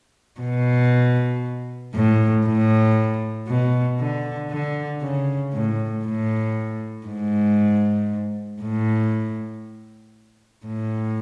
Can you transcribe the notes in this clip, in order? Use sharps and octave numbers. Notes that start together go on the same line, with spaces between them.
B2
A2
A2
B2
D3
D3
C#3
A2
A2
G#2
A2
A2